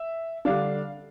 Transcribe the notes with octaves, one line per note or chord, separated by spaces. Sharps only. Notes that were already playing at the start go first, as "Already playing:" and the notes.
Already playing: E5
D3 G3 D4 F5